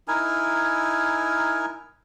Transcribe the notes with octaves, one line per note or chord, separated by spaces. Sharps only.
D#4 E4 A#4 G#5